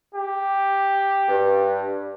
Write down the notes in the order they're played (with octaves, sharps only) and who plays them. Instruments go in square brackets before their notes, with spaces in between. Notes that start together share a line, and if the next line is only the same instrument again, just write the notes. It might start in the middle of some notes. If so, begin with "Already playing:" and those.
[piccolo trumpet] G4
[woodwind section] G2